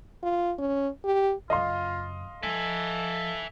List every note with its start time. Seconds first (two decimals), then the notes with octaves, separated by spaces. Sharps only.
0.23 F4
0.59 C#4
1.05 G4
1.50 F#2 C#3 F4 D#5 F5 C6
2.43 F3 A4 E5 G#5